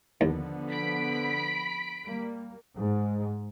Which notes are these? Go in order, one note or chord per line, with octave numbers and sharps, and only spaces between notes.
D#2 D3 F3 B3
B5 B6 D7
G3 A#3
G#2